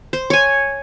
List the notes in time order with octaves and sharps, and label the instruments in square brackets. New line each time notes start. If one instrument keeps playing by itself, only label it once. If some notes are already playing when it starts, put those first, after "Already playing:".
[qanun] C5
C#5 G#5